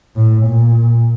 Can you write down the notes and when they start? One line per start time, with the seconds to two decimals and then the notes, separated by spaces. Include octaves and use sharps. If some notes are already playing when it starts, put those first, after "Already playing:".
0.16 A2
0.46 A#2